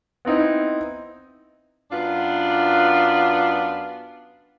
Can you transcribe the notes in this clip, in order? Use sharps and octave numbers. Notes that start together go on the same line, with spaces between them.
B3 C4 D#4 E4
F#2 B3 D4 F4